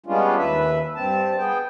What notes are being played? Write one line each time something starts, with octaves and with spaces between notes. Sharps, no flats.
G3 G#3 B3 C#4 D4 F4
D#2 B4 E5
G2 C4 A5
B3 G#4 G5